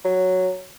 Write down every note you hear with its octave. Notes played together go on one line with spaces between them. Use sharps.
F#3